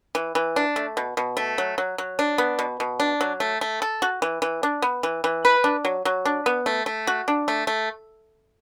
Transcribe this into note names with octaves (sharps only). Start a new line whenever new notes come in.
E3
E3
D4
A3
B2
B2
A3
F#3
F#3
F#3
D4
B3
B2
B2
D4
F#3
A3
A3
A4
F#4
E3
E3
D4
B3
E3
E3
B4
D4
F#3
F#3
D4
B3
A3
A3
F#4
D4
A3
A3